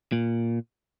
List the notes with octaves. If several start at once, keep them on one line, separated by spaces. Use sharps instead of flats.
A#2